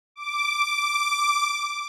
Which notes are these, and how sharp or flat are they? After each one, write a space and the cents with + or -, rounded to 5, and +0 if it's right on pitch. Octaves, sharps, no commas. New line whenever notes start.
D6 -5